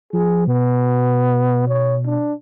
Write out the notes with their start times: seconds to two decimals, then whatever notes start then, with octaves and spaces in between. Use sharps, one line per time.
0.13 F3 G#4
0.47 B2 B3
1.69 C#5
2.06 D4